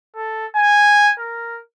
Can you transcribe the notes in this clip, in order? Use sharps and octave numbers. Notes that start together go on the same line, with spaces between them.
A4
G#5
A#4